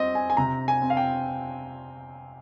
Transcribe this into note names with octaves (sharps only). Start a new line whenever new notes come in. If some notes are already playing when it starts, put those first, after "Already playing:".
Already playing: G3 C4 D#5
G#5
G#5
C3 A#5
G#5
C4
F5
G5